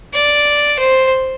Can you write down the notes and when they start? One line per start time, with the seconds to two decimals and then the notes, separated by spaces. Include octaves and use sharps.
0.13 D5
0.79 C5